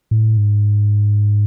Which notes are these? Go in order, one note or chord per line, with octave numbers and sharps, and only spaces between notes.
A2
G#2